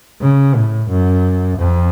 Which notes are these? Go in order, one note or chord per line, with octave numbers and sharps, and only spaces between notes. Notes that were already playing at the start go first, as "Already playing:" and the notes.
C#3
A2
F#2
F2